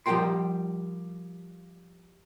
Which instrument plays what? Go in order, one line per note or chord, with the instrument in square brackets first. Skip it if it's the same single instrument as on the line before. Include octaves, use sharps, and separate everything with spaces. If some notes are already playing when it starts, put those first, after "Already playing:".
[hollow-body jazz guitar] F3 G3 G4 A#4 G5 C6